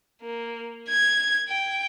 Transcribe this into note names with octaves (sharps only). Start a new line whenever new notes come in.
A#3
G#6
G5